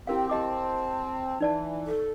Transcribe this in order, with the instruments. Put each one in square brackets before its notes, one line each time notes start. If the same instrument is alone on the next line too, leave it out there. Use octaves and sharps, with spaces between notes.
[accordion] C4 [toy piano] E4 A#4 F5 [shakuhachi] G4
[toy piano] G4 D#5 D6 [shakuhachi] A5
[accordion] E3 [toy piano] D#4 D5 A5
[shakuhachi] A4